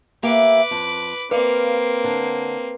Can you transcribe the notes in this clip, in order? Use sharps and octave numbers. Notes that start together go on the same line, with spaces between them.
A#3 G4 B4 E5 D6
F2
A#3 C4 B4 D5 F5
D3